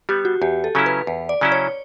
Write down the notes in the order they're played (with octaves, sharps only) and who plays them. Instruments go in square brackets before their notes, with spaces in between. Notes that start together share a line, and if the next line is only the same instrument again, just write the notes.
[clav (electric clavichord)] G3 B3 [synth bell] G4
[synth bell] F#4
[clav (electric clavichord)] E2 [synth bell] G4
[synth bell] A4
[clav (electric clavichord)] C#3 F#3 C#4 E4
[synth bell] B4
[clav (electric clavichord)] E2
[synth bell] D5
[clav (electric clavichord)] C#3 F#3 C#4 E4
[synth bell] C#5